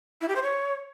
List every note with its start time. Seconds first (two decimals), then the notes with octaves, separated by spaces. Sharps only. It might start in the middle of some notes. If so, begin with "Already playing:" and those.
0.21 E4
0.28 G4
0.36 C5
0.43 C#5